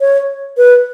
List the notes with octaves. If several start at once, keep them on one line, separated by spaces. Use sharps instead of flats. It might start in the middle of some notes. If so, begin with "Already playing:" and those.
C#5
B4